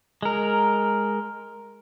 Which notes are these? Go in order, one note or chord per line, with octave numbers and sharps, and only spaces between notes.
G#3 A#4